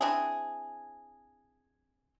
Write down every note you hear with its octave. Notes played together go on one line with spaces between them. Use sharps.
C4 D4 E4 G#4